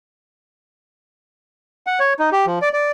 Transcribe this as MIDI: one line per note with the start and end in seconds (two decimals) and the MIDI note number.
1.87 1.99 78
2.00 2.13 73
2.19 2.30 63
2.32 2.46 67
2.46 2.59 53
2.62 2.69 74
2.73 2.91 74